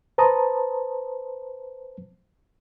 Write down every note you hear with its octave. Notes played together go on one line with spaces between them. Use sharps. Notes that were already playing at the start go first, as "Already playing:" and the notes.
B4 C5 A5 A#5 D#6